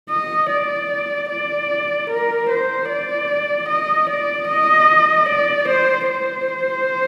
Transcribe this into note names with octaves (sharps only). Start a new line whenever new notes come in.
D#5
D5
D5
A#4
C5
D5
D#5
D5
D#5
D5
C5
C5